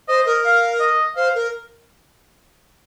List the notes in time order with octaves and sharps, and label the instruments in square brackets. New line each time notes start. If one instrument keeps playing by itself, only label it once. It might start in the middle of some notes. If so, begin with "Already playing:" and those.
[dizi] C5 [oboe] D#5
[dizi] A#4 [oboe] D#5
[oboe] F5
D#5
[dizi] C5 [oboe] F5
[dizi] A#4